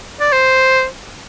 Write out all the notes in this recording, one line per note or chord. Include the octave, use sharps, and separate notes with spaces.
D5
C5